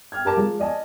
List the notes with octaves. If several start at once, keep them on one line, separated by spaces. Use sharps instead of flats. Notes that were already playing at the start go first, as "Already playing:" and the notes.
G5 F6 G#6
G4 A#4 A5 A#5 D6
F3 G#3
D5 D#5 G#5 A5